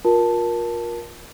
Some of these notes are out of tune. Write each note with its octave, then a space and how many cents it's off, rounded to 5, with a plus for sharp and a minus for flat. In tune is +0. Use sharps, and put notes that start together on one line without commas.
F4 +30 A#4 +20 A5 +0